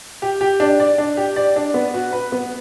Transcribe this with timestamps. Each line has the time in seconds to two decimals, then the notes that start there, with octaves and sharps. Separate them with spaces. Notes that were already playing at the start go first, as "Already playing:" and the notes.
0.22 G4
0.41 G4
0.60 D4
0.80 D5
0.98 D4
1.17 G4
1.36 D5
1.56 D4
1.74 B3
1.94 F#4
2.12 B4
2.32 B3